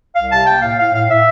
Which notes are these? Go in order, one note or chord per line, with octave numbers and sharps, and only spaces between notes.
C2 F5
C3 A5
A#3 G5
A2 F5
A2 F5
A2 F5
A2 E5